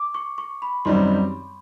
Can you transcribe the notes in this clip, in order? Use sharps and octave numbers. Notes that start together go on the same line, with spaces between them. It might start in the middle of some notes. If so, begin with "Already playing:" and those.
Already playing: D6
C#6
C#6
B5
F#2 D#3 G3 C4 D#4 C6